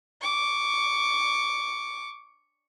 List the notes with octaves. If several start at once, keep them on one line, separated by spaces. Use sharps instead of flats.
C#6 D6